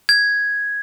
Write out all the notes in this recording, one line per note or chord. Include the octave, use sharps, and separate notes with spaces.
G#6